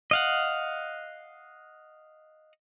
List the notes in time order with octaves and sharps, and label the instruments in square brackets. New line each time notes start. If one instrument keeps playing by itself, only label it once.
[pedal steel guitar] D#5 F5 F#5